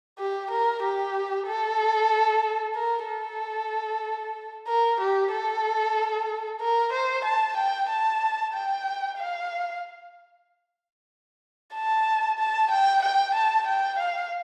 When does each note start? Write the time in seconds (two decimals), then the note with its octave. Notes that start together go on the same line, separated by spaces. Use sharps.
0.19 G4
0.51 A#4
0.83 G4
1.47 A4
2.76 A#4
3.08 A4
4.68 A#4
5.01 G4
5.32 A4
6.61 A#4
6.93 C5
7.25 A5
7.57 G5
7.89 A5
8.54 G5
9.18 F5
11.75 A5
12.39 A5
12.71 G5
13.03 G5
13.35 A5
13.67 G5
13.99 F5